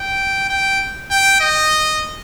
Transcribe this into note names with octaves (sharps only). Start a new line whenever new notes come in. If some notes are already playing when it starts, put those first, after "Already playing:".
Already playing: G5
G5
G5
D#5